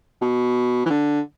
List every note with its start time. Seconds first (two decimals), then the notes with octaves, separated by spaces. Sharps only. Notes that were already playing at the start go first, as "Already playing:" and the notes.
0.21 B2
0.86 E3
0.90 D3